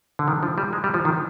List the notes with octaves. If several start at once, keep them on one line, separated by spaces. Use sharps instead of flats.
D3
D#3
F3
G3
G#3
G3
F3
D#3